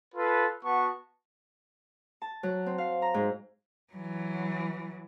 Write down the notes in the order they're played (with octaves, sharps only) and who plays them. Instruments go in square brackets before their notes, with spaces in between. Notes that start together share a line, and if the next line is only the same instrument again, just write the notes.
[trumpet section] F4 A4 B4
B3 F#4 A5 C#6
[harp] A5
F#3
C4
F5
A#5
G#2
[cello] E3 F#3